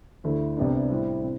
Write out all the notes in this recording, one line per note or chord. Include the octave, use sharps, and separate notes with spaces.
D2 D3 A3 E4
C2 C3 G3 B3 D4
A2 G3 C4 E4
C3